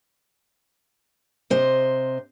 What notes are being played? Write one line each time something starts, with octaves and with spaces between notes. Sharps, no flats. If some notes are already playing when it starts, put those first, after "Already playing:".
C3 C5 D#5